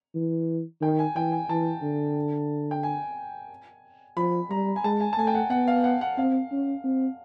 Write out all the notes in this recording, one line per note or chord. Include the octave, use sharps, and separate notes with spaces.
E3
D#3 G5
G#5
E3 G5
G#5
E3 A5
D3
G5
G#5
F3 B5
G3 A#5
G#5
G#3 A5
G#5
A5
A3 G#5
G5
F#5
B3 F#5
F5
F#5
F#5
C4 F5
C#4
C4